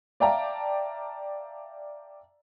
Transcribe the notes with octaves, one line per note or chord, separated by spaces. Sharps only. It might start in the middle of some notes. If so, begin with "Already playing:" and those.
D5 E5 F5 G5 A5 A#5